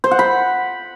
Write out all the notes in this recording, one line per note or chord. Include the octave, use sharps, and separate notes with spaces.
C5
F#5
B5